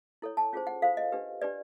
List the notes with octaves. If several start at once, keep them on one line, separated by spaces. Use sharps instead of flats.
E4 A4 C#5
A5
C#4 F4 G#4 C5
F#5
F4 A4 C5 F5
D#5
D4 G4 B4
D4 G4 B4 D5